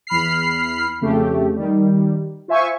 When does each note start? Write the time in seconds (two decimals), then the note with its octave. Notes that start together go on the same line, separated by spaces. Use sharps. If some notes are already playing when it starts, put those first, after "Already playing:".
0.07 E2 B5 F6 C7
1.01 F2 C#3 A3 G4
1.56 D#3 G3
2.48 F4 C5 E5 G#5 C#6